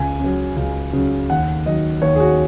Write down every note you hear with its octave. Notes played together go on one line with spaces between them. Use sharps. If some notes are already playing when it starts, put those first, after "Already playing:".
Already playing: C#2 G#5
C#3 F#3
C#2
C#3 F#3
D#2 F#5
D#3 F#3 D#5
D#2 C#5
G#4
F#4